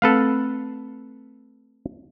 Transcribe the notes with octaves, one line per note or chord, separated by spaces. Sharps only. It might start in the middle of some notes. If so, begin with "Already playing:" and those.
A3 C4 A4 B4 F5